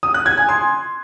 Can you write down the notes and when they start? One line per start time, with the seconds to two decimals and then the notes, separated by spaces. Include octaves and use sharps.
0.03 D#6
0.14 F#6
0.26 G#6
0.37 G#5
0.49 C6